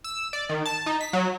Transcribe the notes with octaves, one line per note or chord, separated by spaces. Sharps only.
E6
D5
D#3
A5
D#4
B6
F#3